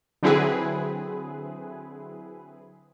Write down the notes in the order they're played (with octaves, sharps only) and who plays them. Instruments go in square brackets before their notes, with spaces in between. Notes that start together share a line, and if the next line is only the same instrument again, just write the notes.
[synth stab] D3 F#3 C4 E4 G#4 B4